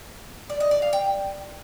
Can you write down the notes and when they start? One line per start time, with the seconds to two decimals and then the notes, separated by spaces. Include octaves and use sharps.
0.50 D5
0.60 D#5
0.71 D5
0.82 F5
0.93 G5